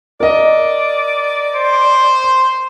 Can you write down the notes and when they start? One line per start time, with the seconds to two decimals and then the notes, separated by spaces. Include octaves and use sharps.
0.20 A#4 D5 D#5
1.55 C5